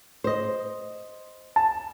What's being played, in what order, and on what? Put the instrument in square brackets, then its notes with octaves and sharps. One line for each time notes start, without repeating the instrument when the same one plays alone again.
[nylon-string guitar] C5 D#5
[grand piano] A5